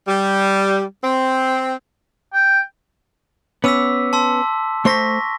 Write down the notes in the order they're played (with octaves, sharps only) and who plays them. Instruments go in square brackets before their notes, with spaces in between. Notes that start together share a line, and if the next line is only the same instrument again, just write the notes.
[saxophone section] G3
C4
[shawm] G5
[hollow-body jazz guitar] B3 C#4 [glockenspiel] D6 E6 B6
[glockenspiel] A5 C6 E6
[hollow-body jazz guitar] A3 C5 C6 [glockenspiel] C#6 A#6 B6